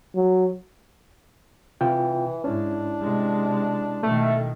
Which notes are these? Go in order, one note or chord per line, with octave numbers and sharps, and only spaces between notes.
F#3
C3 E3 F4 G5
G#2 C#4 D4 E4
C3 G#3
B2 D#3 A3